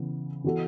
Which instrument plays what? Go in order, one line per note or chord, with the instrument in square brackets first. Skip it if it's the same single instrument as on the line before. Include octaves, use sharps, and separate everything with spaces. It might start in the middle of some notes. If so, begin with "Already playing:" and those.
Already playing: [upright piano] C#3 E3 B3
E3 B3 F#4 A4